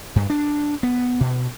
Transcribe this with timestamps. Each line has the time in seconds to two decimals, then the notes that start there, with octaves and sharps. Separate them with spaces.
0.16 G2
0.30 D4
0.83 B3
1.20 B2